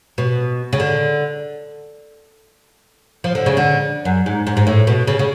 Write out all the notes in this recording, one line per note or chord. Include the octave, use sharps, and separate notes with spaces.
B2
C#3
D3
F3
D3
C#3
D3
F#2
G#2
G#2
G#2
A2
B2
C#3
C#3